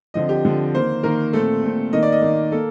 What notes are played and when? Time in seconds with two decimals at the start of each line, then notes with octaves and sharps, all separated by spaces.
0.14 D3 F3 C4 D#5
0.29 G4
0.45 D3 F3 C4
0.74 D#3 A#3 C5
1.03 D#3 A#3 A#4
1.33 A#2 A3 C4 A4
1.63 A#2 A3 C4
1.93 D#3 A#3 D#5
2.03 D5
2.12 D#5
2.22 D#3 A#3
2.52 A#3 A4